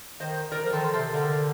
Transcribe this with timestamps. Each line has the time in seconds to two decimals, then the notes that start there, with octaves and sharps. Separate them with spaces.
0.20 D#3 C5 D#5
0.52 A#4 D5
0.65 F3
0.73 D#3 A4 C5
0.93 C3 A4 C5
1.14 D3 A#4 D5